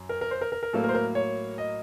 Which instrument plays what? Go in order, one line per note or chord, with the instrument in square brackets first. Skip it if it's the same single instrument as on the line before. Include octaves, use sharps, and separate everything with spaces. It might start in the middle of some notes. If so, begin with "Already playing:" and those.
Already playing: [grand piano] F#2
A#4
A#4
C5
A#4
A#4
A#4
A2 F#3 A#3 A4
A#4
C5
A#4
C#5
D#5